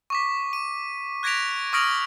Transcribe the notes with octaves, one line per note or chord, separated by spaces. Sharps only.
C#6 D6 B6
D#7
F#6 G#6 A#6 B6 D7 F7
C#6 D#6 F6 A#6 D7 F#7